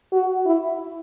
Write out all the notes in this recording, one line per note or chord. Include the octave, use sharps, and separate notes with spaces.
F#4
E4